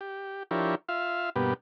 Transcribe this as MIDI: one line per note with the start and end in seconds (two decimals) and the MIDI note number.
0.01 0.43 67
0.51 0.75 53
0.51 0.75 62
0.51 0.75 64
0.51 0.75 67
0.51 0.75 70
0.51 0.75 73
0.89 1.30 65
0.89 1.30 76
0.89 1.30 77
1.36 1.54 43
1.36 1.54 47
1.36 1.54 58
1.36 1.54 59
1.36 1.54 67